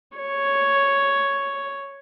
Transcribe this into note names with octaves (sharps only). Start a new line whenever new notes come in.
C#5